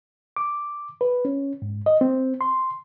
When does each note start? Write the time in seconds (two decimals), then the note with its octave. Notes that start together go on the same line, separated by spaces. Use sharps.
0.36 D6
1.01 B4
1.25 C#4
1.62 G#2
1.86 D#5
2.01 C4
2.41 C6